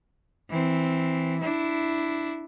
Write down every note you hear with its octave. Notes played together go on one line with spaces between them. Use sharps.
E3 C4
D4 E4